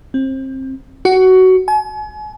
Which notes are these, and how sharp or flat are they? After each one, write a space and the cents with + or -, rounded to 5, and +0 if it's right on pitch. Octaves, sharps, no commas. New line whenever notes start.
C4 +25
F#4 +15
G#5 +40